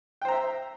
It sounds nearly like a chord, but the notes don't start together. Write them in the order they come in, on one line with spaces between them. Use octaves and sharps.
G5 C5 A#5 E5